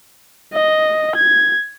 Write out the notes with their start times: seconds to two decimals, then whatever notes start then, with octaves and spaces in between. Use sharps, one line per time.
0.53 D#5
1.16 G#6